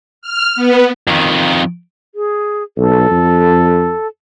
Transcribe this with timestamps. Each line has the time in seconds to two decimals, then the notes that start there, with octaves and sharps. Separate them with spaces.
0.22 F6
0.56 B3
1.07 F2 D#3
2.15 G#4
2.77 B1 A4
3.11 F2